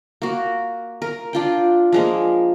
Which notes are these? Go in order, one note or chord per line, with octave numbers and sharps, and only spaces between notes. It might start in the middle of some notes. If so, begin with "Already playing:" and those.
A#3 F#4
A#4
D4 F4 G5
F3 G#3 A#3